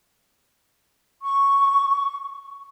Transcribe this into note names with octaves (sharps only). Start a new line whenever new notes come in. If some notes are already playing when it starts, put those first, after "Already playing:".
C#6